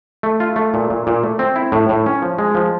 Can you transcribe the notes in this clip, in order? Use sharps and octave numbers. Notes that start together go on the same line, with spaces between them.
A3
F4
A3
A#2
A#2
A#2
A3
C4
E4
A2
A2
C#4
F3
G#3
F3